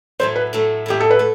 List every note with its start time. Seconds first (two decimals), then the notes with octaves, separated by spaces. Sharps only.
0.19 A2 F#3 A3 C5
0.36 B4
0.53 A2 F#3 A3
0.86 A2 F#3 A3 G4
1.00 A4
1.10 B4
1.19 A3